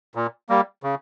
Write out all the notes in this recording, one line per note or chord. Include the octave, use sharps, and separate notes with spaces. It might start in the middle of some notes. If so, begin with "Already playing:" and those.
A#2
G3 A#3
C#3